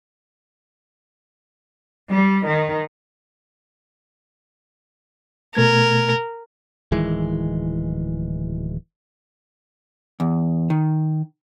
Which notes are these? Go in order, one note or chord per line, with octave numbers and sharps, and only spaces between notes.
G3
D#3
B2 A3 A#4 G#6
D1 D#3 E3 G#3
E2
D#3